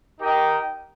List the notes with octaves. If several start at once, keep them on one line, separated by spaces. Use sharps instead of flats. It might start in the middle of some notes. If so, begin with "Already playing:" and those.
D#4 G4 A#4 D#5 G5